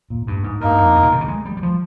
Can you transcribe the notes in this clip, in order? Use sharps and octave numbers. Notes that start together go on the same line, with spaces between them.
A#2
G2
G#2
G2 A#3 D#4 A#4
F2
G2
A#2
C3
C#3
G#3
G3
G3
F3